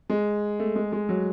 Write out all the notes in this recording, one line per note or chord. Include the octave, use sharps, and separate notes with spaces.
G#3
A3
G#3
G#3
F#3